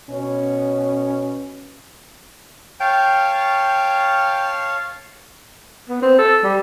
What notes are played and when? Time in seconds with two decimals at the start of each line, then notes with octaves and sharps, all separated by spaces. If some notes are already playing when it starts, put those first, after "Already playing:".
0.10 B2 C#4
2.80 C#5 F5 G5 A5
5.89 B3
6.02 C4
6.18 A4
6.43 G3